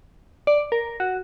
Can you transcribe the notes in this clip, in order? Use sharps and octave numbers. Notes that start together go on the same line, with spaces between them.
D5
A#4
F#4